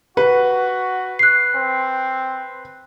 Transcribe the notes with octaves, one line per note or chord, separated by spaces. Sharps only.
F#4 B4
F#6 C7
C4